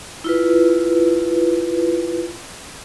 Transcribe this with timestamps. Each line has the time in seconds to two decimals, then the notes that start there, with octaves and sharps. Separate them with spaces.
0.24 E4 F4 B4